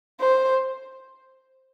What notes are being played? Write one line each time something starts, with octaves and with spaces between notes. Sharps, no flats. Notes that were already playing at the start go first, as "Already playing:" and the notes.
C5